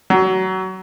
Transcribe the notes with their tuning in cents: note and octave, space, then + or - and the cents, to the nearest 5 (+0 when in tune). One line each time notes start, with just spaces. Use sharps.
F#3 +25